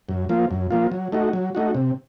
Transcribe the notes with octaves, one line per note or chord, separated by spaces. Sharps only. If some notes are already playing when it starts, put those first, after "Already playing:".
F#2
F3 A#3 F4
F#2
F3 A#3 F4
F#3
A3 D#4 F#4
F#3
A3 D#4 F#4
C3